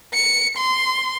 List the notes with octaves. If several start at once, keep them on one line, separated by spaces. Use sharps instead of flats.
C#7
C6